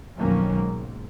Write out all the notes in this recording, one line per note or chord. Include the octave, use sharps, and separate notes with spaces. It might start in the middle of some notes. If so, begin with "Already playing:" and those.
B1 F2 D#3 F#3 A#3 C#4
G#2